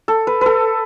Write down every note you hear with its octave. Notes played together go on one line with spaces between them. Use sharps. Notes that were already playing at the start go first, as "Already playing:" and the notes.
A4
B4
A4 B4